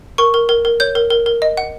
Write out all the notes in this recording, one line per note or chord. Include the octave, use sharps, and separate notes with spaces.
A#4 C#6
A#4
A#4
A#4
C#5 G6
A#4
A#4
A#4
D#5
F#5